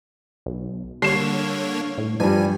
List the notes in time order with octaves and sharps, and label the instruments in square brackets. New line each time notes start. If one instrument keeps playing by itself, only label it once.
[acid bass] B1
[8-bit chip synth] D3 A#3 C#5 [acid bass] G3 [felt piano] C7 E7
[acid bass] A2
[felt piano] G2 G3 [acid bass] F3 [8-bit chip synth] G#5